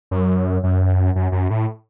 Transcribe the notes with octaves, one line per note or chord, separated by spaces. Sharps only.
F#2
F#2
F#2
F#2
A2